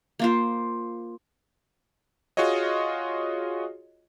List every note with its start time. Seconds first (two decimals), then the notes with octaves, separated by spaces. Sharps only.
0.19 A#3 F4 C5
2.37 F4 F#4 G#4 C#5 D#5